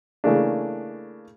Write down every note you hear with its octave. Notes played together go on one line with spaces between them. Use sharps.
C#3 E3 A3 A#3 D4